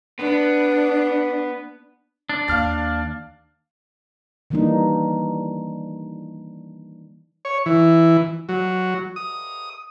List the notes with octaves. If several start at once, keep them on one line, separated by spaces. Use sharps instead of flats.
B3 D4
D4
D#2 F5 F6 A6
D#3 E3 G3 A#3 D4 D#4
C#5
E3
F#3
D#6